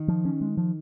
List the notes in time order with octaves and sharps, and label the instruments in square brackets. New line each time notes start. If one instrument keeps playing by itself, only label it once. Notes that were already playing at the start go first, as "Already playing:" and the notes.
Already playing: [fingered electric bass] D#3
[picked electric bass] F3
C#4
G#3
F3